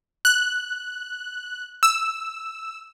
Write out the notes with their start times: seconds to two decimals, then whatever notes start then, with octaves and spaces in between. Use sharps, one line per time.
0.25 F#6
1.83 E6